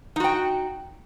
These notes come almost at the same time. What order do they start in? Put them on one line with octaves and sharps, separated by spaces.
D#4 F#4 G5